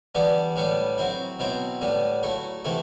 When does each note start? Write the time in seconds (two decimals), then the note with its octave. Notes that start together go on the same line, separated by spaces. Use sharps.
0.15 E3 G3 B3 D4
0.56 A2 G3 B3 D4
0.98 F#3 C4 E4
1.39 B2 F#3 C4 E4
1.81 A2 G3 B3
2.23 F#3 A3 E4
2.65 C3 E3 A3 E4